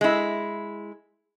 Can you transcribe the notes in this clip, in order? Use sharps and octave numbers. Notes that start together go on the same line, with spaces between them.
G#3 E4